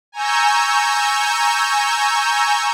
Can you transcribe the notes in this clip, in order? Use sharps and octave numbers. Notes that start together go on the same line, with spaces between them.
G#5 A#5 C#6 E6 G6